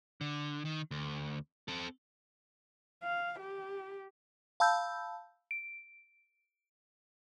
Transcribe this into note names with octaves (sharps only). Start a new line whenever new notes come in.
D3
D#3
D2
C4 A4
F5
G4
F5 A5 B5 E6 G6
D7